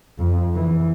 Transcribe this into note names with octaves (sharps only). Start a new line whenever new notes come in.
F2
E3